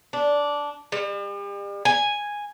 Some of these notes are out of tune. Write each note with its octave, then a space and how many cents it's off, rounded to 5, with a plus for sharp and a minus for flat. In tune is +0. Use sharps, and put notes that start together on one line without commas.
D4 -10
G3 +40
G#5 -5